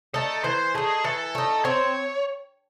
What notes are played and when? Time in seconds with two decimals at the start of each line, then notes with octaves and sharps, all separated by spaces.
0.14 A3 D#4 A4
0.44 E3 C5
0.75 A3 D#4 G#4
1.04 E3 A4
1.35 A3 D#4
1.65 C4 C#5